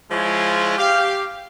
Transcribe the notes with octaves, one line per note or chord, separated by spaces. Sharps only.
F3 G#3 E4 F4 C#5
G4 F5